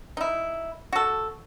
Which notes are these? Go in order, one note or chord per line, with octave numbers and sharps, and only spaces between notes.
D#4 E4
F#4 A4